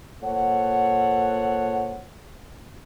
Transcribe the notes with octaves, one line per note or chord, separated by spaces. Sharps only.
A#2 A4 C5 C#5 F#5